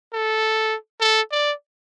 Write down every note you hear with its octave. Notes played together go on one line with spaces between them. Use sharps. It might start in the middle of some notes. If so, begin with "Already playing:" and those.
A4
A4
D5